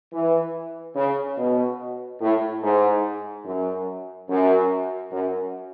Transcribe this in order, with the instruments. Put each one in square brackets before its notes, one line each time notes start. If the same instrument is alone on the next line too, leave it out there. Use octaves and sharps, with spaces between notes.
[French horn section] E3
C#3
B2
A2
G#2
F#2
F#2
F#2